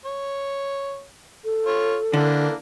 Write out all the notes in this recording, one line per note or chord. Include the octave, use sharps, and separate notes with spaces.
C#5
A4
F4 C#5
D3 E3 A#3 D4